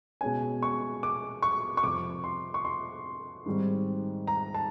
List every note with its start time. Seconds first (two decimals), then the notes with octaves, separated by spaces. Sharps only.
0.21 B2 G#3 C#4 G#5
0.62 C#6
1.03 D6
1.42 C#6
1.77 C#6
1.83 F2 C3 F3 D6
2.24 C6
2.54 C#6
2.65 C6
3.46 G#2 D#3 G3 C4
4.27 A#5
4.54 A5